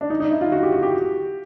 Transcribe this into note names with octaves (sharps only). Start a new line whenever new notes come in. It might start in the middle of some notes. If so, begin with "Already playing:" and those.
D4
D#4
D#4
E4
F4
F#4
G4
F#4
G4